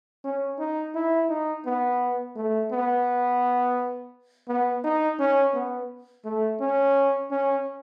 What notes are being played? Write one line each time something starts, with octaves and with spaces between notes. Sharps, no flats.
C#4
D#4
E4
D#4
B3
A3
B3
B3
D#4
C#4
B3
A3
C#4
C#4